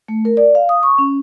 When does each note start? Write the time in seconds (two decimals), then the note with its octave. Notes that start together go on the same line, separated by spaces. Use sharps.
0.08 A3
0.25 A#4
0.37 D5
0.55 F5
0.69 D#6
0.83 C#6
0.98 C#4